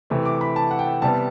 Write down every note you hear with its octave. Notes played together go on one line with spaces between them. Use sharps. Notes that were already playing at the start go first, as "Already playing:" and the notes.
C3 E3 A3
D6
B5
A5
F#5
G5
C3 G3 B3 A5